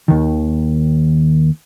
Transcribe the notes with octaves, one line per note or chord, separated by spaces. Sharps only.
D#2 D#3